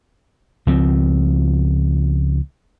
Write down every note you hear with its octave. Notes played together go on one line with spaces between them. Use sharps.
C#2 F3 C4